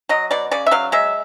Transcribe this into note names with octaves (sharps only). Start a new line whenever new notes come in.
F#3 D#5
B2 D5
C#3 D5
E5
F#3 F5
G#3 E5